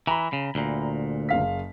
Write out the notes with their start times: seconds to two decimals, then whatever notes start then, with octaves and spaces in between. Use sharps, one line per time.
0.07 E3 A#5 B5
0.33 C#3
0.55 D2 A#2
1.29 F#1 F5 B6